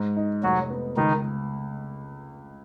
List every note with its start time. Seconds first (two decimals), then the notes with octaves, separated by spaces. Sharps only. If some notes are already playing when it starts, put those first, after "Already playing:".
Already playing: G#2
0.17 D#4
0.43 F1 F#3 F#4
0.70 B3
0.97 C#2 D#3 D#4